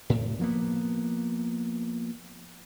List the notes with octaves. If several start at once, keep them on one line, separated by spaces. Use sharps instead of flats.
A2
F3 A#3 B3